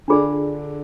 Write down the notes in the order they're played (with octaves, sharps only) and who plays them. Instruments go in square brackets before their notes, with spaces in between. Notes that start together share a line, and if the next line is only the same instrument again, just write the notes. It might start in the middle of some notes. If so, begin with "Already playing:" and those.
[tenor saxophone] D3 [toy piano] D4 F4 G#4 D5